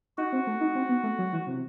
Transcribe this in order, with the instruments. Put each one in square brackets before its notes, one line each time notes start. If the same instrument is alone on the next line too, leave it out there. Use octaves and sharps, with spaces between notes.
[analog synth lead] D#4 [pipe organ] F#4
[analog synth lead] C4
A3
D#4
C4
B3
A3
F#3
E3
C3